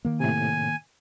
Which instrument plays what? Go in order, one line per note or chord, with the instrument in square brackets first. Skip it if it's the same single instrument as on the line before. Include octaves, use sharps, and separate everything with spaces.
[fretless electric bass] D#3 A#3
[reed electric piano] A2 C3 [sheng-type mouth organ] G#5